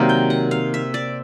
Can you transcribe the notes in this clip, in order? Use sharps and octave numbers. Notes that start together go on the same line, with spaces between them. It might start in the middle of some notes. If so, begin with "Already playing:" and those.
Already playing: C3 D#3 F#3 A#3 D5
G5
F#5
F5
E5
D5